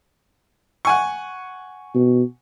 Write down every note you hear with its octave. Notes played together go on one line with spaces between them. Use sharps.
F#5 G#5 C#6
B2